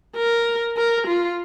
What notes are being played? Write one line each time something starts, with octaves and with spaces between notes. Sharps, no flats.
A#4
A#4
F4